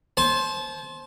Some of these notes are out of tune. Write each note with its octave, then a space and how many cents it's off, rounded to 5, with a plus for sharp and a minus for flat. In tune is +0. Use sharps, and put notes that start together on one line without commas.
C5 +15 A5 -35